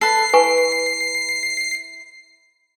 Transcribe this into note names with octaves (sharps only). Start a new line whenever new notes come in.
A4 B4 C7
E4 B4 G#5 C#6